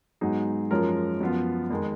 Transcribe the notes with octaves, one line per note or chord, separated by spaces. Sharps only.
G#2 F#3 B3 D#4 G#4
F#2 F3 G#3 C#4 F4 A#4
F#2 F3 B3 F4
F2 D#3 G#3